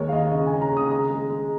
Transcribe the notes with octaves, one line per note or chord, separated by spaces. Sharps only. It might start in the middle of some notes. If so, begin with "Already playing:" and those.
Already playing: D#2 G#3 A#4 C#5
F5
D#2 D#5
C#3 D#5
G#5
G#3
A#5
C#3 D#6
G#3 A#5
G#3
G#3